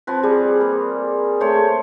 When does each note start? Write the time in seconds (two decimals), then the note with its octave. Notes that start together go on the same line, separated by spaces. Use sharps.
0.07 F3 C4 B4
0.23 G3 G#4
0.61 A#3
1.40 A3 C5 C#5